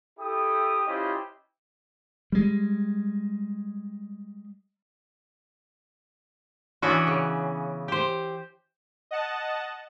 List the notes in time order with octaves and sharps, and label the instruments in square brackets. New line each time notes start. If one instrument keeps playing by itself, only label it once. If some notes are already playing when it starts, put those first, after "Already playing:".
[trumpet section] E4 G4 A4 G5 D#6
C#4 E4 F4 G4 C5 D#5
[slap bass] G3 G#3
[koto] E3 B3 C#4 D4 F#4
C#3
G4 C5
[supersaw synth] D#5 F#5 A5